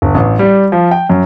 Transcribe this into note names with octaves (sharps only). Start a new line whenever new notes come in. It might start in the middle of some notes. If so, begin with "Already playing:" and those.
G1
A1
G3
F3
G5
F#2